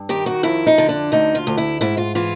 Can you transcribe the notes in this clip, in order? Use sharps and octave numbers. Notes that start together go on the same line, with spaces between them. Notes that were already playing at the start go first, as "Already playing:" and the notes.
Already playing: G2
D#3 G4
F#4
F2 E4
D#4
D3
D4
D2 D#4
F4
D2
E4
G#2 E4
F4
E3 F4